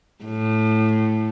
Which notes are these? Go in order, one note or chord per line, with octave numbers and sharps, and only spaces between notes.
A2